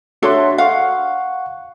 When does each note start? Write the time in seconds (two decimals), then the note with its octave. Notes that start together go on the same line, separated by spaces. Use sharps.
0.22 D4 F#4 A4 C#5 E5 C6
0.58 F5 F#5 C#6